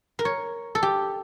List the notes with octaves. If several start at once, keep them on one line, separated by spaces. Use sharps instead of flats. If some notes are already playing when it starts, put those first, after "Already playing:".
A#4
C#5
A4
G4